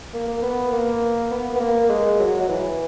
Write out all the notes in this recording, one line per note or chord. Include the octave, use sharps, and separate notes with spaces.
A#3
A#3
B3
A#3
B3
B3
A#3
G#3
F#3
F#3
E3